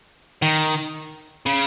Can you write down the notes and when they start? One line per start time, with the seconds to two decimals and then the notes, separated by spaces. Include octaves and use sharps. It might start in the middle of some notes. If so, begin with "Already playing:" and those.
0.42 D#3
1.46 C#3